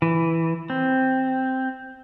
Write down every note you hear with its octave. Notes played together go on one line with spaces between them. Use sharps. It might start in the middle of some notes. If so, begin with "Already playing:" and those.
E3
C4